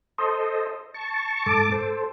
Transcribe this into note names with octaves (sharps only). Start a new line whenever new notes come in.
A4 C5 D#5
A5 C#6
G#2 A4 A5 D6
A4 C5